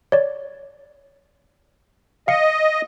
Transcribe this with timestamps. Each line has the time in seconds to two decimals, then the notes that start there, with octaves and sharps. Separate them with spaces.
0.12 C#5 D5
2.28 D#5 F5 C#7